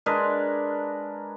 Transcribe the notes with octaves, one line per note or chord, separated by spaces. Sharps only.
G#3 D4 A#4 B4